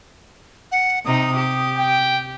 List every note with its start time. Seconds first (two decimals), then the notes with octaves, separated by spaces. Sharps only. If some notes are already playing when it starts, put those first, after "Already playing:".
0.72 F#5
1.05 C3 D#4 D#6
1.37 G4
1.78 G5